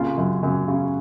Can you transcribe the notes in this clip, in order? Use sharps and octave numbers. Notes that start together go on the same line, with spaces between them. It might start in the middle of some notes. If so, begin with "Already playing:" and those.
Already playing: C2 A#2 C#3 F4
F#2
F#2
C#3